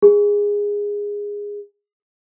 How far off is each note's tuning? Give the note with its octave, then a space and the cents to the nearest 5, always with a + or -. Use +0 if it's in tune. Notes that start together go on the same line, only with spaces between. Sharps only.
G#4 -15